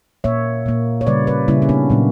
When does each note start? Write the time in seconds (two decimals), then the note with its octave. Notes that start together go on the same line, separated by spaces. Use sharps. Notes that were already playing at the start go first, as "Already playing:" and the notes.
0.24 A#2 A#3 C#5 E5
0.66 A#2 A#3
1.01 C#5
1.07 C#3 G3 A#3 B4 D5
1.27 B4 D5
1.48 C#3 G3 A#3 C#4 E4
1.62 C#4
1.69 B3 D4
1.90 A#2 F#3 A#3